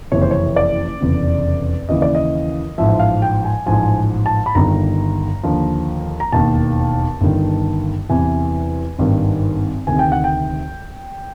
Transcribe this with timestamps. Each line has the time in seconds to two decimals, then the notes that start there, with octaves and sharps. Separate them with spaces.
0.12 F#1 F2 C3 E3 C#5
0.22 C5
0.31 C#5
0.56 D5
1.01 F1 E2 C#3
1.89 D#2 C#3 E3 D#5
2.02 D5
2.15 D#5
2.78 A1 G#2 F3 E5
3.00 F5
3.22 G5
3.45 G#5
3.66 A1 G#2 F3 G#5
4.26 A5
4.46 B5
4.55 G1 G2 D#3 A#5
5.43 D#2 D3 F3
6.20 A#5
6.32 E1 D#2 D#3 A5
7.21 G1 G2 D#3
8.09 E2 C3 E3 G#5
8.98 G#1 G2 D#3
9.87 D2 C3 D#3 G#5
9.99 G5
10.12 F#5
10.24 G5